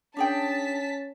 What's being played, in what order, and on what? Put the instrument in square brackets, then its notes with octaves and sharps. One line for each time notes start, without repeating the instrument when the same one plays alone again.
[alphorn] C#4 [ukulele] D4 G#4 G5 [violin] A5 B6